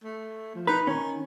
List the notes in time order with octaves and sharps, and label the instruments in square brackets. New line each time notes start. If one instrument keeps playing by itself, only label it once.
[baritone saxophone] A3
F3
[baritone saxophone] D#4 [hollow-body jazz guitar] B4
[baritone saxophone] D#3 [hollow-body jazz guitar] C#4